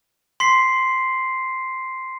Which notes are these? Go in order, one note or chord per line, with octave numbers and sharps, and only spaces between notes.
C6 B6 C7